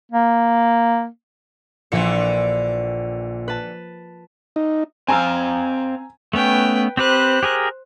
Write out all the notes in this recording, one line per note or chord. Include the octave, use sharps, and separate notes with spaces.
A#3
A#1 A#2 D3 E3 C#7
B4 A5
D#4
C4 F5 G#5 A#5 E6
A3 B3 C#4 B4 G5
C4 G4 B4 C5 F#6
G4 G#4 A#4